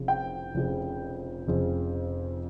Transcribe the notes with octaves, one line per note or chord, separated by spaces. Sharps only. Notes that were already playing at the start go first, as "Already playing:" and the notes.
Already playing: F1 F2 C#3
G5
F1 F2 C#3
F1 F2 C#3